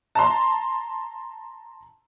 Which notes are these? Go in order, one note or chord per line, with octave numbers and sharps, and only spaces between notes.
A5 A#5 C6